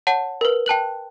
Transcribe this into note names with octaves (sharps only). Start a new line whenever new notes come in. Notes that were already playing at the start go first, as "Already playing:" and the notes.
C#5 F#5 A5
A#4 B4
G5 A5 F#6 F#7